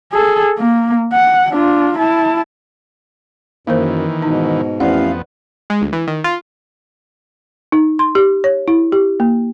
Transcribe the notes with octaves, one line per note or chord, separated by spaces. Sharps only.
G#4 A4
A#3
F#5
D4 F4
E4 A5
F#2 D#3 E3 A#3 A#4 C5
G#2 B2 D#4
A1 F2 E3 B3 C5 D5 F5 F#5
G#3
D2
E3
D#3
F4
D#4
C6
G4
C#5
E4
G4
A#3